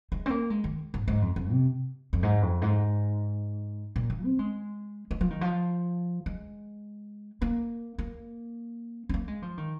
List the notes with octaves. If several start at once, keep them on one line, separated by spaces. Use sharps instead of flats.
G#3
C4
A#3
G#3
D#3
G#2
G#2
F2
F2
C3
F2
G#2
F2
G#2
A#2
D#3
C4
G#3
G#3
F3
D#3
F3
G#3
A#3
A#3
C4
A#3
G#3
F3
D#3